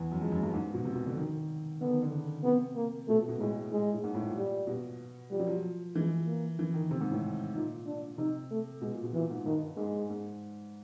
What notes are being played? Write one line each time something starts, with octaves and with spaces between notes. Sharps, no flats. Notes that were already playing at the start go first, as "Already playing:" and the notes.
Already playing: E2
F#2
F2 G#3
F#2
G2
G#2
B2
C3
B2
D3
D#3
D3 B3
D#3
D3
C#3
C3 B3
A#3
B2 A3
A#2
B2
A2 G#3
A2 G#3
A2
G#2
A2
A#2
G3
B2
F3 G3
F#3
F3
E3 G#3
A#3
E3
D#3
C3 C4
G#2
A2
A#2 D#4
D4
C3 D#4
A3
B2 G#3
A#2
B2
A#2 E3
G#2
G2 D#3
G#2 G#3
G#2